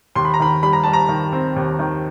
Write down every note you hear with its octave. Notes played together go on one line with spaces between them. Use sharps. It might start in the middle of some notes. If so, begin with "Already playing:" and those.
D#2 C6
B5
A#5
D#3 B5
G3 B5
A#5
G3 A5
A#5
D#3
C4
D#2
D#3